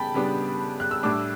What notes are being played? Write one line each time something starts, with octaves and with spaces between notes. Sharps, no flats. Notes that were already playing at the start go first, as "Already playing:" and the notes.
Already playing: C#3 G3 B3 G5 A5 B5
C#3 G3 B3 D4
F#6
E6
A2 G3 D4 D6